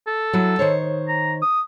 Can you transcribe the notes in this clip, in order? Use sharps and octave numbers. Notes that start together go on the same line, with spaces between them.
A4
F#3 E4 F#4
D#3 C5 C#5
A#5
D#6